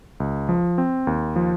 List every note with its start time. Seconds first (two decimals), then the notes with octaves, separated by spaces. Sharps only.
0.20 C#2
0.49 F3
0.78 C4
1.07 D#2
1.36 F3